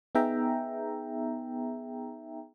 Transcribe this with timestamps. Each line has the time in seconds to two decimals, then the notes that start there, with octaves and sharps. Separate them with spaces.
0.15 B3 D#4 G#4 E5 G5 A#5